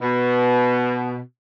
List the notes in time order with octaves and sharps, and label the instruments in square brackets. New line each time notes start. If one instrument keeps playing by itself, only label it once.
[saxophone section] B2